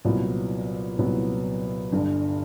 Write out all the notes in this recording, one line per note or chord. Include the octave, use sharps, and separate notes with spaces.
C2 A#2 F#3 B3 E4
C2 A#2 F#3 B3 E4
G1 G2 D3